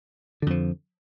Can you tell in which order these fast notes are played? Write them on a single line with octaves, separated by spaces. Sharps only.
D3 F2 F3